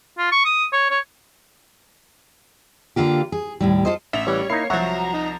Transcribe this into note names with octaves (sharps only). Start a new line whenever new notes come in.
F4
C#6
D#6
C#5
C#5
D3 A#3 F4 G4
G#4
D#2 A2 G3
F4 G4 A4 C5 D#5
A1 E5 F7
E3 G3 C#5
A#3 D#4 E4 C7
C2 F3 F#3 F#4 E5 A#5
D#4